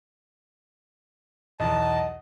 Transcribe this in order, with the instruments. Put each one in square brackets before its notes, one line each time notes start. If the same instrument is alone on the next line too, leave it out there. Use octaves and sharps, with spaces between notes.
[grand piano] B1 E2 [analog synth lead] D#5 [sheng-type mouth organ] A5